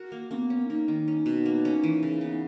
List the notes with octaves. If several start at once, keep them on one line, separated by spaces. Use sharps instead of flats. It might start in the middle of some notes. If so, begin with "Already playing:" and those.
Already playing: F#4 A#4
A#3
A#3 B3 C#4
C#4
A#3 D#4
D#3
C#4
B2
A#3
C#4
E3
C#3
B3